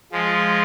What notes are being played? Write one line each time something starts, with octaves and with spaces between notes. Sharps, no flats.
F3 G#3